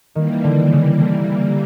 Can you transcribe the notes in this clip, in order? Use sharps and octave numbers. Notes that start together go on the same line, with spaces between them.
D#3 E3 G3 A#3
D3
C#3
D3